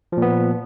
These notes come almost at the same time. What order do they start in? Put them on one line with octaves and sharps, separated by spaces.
F3 A#2 B3